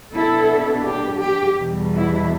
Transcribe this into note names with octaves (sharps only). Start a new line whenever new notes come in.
B2 B3 D4 E4 A4
G4
G4
E2 B2 G3
E4